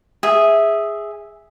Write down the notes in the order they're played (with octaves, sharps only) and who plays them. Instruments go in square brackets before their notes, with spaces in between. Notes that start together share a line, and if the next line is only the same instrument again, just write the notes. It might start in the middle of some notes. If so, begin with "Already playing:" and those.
[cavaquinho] G#4 E5